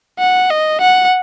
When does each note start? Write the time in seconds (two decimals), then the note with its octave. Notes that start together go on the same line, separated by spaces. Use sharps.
0.19 F#5
0.50 D#5
0.81 F#5